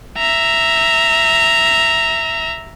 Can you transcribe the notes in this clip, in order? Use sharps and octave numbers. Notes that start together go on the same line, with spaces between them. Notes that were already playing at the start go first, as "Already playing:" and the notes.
E5 A#5